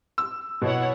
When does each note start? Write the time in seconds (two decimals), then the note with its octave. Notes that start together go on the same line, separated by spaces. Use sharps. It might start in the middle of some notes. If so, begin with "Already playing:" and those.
0.18 E6
0.62 B2 E4 C#5 F#5